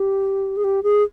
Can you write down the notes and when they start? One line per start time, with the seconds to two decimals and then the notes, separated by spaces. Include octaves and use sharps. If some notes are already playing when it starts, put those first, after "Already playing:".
Already playing: G4
0.57 G#4
0.64 G4
0.83 G#4